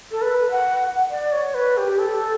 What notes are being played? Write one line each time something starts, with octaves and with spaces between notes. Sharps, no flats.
A4
B4
F#5
D5
C#5
B4
G4
A4